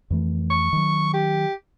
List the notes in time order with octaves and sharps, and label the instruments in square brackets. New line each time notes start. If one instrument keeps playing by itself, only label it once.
[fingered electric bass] F2 E3 A3
[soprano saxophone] C#6
[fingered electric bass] D#3 F#3
[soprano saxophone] G4